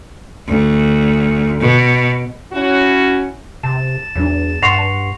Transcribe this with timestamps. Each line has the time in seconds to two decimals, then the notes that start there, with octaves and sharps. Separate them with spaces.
0.47 D2
1.60 B2
2.52 C#4 E4 F#4
3.63 C3 A5
4.16 E2 F#3 D4
4.62 G2 F#5 C6 C#6 A#6 C7 F7